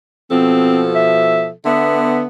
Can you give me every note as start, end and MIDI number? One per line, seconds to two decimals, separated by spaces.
0.31 1.51 47
0.31 1.51 53
0.31 0.85 60
0.31 1.51 69
0.95 1.48 76
1.66 2.28 50
1.66 2.28 59
1.66 2.23 76